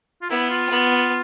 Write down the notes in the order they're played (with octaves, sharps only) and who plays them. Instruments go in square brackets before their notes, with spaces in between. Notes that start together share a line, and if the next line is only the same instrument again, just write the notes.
[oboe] F4
[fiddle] B3 [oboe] E4
[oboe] F4
[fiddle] B3